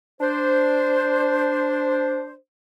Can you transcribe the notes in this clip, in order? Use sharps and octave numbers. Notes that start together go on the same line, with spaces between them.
D4 C5